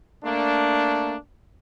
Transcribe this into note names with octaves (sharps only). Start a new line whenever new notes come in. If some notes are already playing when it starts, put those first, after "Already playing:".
A3 A#3 D4